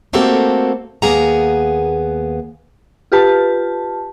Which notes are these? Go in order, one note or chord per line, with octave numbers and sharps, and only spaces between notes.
A3 A#3 C4 F#4 G4 A4
D#2 A#3 B3 G#4 F#5 A#5
F4 G4 B4 A5